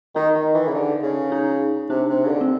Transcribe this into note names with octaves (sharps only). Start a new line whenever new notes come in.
D#3 D#4
D#3
E3
C#3
D3
C#3
D#4
C3 D4
C3
C#3
D3
C4